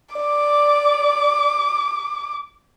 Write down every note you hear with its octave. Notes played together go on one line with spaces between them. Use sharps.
D5 D6